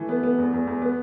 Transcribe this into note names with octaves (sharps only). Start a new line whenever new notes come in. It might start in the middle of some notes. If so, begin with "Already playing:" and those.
Already playing: E3 A3
B3
B3
E2
E2
E2
B3